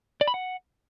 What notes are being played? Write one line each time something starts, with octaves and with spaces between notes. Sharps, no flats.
D5
B5
F#5